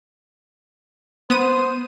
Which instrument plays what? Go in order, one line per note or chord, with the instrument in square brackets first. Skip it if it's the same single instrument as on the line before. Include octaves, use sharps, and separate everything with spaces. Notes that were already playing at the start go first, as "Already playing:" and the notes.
[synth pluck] B3 D#6 D#7 [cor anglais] C5